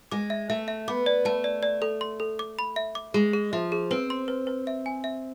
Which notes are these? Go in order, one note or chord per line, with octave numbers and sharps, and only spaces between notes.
G#3 D6
E5
A3 E5
E5
B3 D6
D5
A3 A5
D5
D5
A4
C6
A4
D6
B5
E5
D6
G#3 G#4
G#4
F3 E5
G#4
C4 B4
C6
B4
B4
E5
G#5
E5